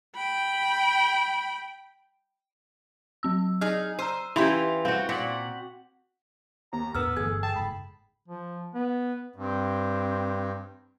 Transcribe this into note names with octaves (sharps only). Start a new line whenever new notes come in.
G5 B5
F#3 C4 E6
D#4 G#4 F6
C5 A#5 E6 D#7
E3 C#4 E4 F4 G4 C6 F7
C4 F#4 F5
A#2 F#4 B6 F#7
D#2 A#5
E2 A2 B3 D4 A#4 B4 E6 F6
G1 E3 A3 G#4 E6 G#6
G5 A5
F#1 G#2 B5
F3
B3
G2 C4